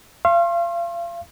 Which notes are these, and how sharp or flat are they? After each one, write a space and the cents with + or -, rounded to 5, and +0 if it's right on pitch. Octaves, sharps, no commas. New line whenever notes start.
F5 -35 C6 +40